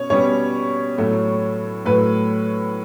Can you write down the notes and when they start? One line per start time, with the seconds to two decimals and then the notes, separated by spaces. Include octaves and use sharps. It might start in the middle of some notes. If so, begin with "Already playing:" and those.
Already playing: B2 C#4 C#5
0.10 B2 G3 C#4 C#5
0.98 A2 F#3 A3
1.85 A2 F#3 A3 B4